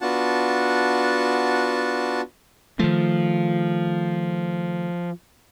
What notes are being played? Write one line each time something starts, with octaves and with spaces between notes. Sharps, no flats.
B3 D4 F4 F#4 F#5 A5
D#3 F3 A3